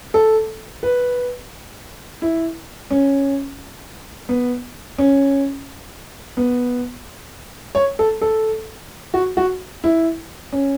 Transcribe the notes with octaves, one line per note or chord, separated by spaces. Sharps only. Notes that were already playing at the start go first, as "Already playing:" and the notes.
A4
B4
E4
C#4
B3
C#4
B3
C#5
A4
A4
F#4
F#4
E4
C#4